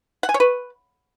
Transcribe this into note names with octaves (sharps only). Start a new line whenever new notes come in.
F#5
G#5
C#5
B4